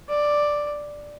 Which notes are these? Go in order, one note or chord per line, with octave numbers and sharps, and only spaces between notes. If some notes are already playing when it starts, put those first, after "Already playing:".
D5